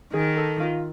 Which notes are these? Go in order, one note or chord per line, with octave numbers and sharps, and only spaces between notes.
D#3 G#4
A4
F4